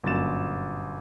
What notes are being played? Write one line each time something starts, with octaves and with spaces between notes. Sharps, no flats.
G1 F#2 A#2 A6 E7